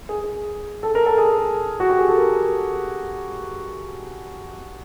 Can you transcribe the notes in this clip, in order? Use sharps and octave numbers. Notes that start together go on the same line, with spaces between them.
G#4
G#4
A4
A#4
A4
G#4
F#4
G4
G#4
A4
A#4